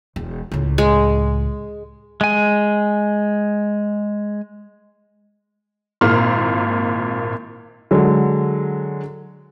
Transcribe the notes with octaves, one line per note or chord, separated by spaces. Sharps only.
E1
C#2 A2
G#3
G#3 G#5
G#1 A#2 E4 A#5 C6 F6
D3 F#3 G#3